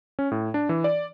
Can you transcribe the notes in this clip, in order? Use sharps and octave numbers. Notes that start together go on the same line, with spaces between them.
C#4
A2
D4
E3
D5